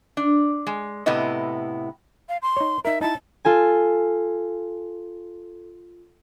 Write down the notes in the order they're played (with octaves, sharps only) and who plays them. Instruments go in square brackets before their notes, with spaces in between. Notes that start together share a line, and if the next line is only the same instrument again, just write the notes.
[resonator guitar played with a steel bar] D4
G#3
A2 C3 B3 E4 D#5
[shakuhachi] F5
C6
[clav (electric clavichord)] D#4 C#5
[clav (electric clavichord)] D#4 A#4 [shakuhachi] E5
[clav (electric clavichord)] D#4 E4 [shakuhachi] A5
[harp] F4 A4 G#5